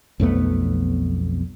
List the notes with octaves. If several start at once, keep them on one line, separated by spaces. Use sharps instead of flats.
B1 F2 A3 B3